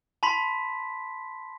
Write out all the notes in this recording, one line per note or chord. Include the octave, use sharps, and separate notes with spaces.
A5 B5 C6 B6